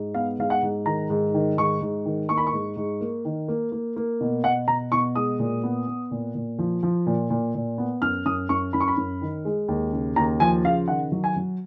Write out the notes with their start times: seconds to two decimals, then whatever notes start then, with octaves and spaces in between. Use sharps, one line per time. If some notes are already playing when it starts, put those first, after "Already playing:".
Already playing: G#2
0.14 B3 F5
0.39 G#2 F5
0.50 F#5
0.62 G#2
0.86 D#3 A#5
1.10 G#2
1.34 D#3
1.57 G#2 C#6
1.81 G#2
2.05 D#3
2.29 A#3 C#6
2.37 B5
2.47 C#6
2.53 G#2
2.77 G#2
3.01 A#3
3.25 D#3
3.48 A#3
3.72 A#3
3.96 A#3
4.21 B2
4.44 B2 F#5
4.68 B2 A#5
4.92 B2 C#6
5.15 G#3 D#6
5.39 A#2
5.63 B3
5.87 B3
6.11 A#2
6.35 A#2
6.59 F3
6.83 F3
7.06 A#2
7.30 A#2
7.55 A#2
7.78 B3
8.02 F#2 F6
8.25 F#2 D#6
8.49 F#2 C#6
8.73 F#2 B5
8.80 C#6
8.88 B5
8.97 F#2
9.22 D#3
9.45 G#3
9.68 D#2
9.93 C#3
10.16 D#2 A#5
10.40 F3 G#5
10.64 C#3 F5
10.88 D#3 F#5
11.12 F#3
11.24 G#5
11.36 F#3